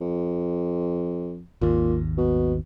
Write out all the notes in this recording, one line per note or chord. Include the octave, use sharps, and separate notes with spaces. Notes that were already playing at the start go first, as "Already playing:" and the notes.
F2
G#1 D#2 A#2
B2